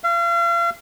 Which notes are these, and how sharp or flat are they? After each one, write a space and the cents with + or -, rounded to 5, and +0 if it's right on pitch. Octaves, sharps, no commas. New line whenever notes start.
F5 -40